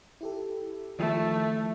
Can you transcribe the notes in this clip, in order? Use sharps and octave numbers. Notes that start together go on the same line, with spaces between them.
E4 G4 A4
D#3 F3 A3 E4